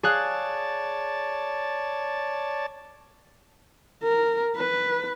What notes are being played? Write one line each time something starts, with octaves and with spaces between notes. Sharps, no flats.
G#4 C#5 D5 F5 A5 F#6
A#4
B4